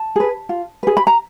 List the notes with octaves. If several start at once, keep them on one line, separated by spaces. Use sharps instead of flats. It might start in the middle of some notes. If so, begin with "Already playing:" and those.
Already playing: A5
G#4 B4
F4
G#4 B4
B5
A#5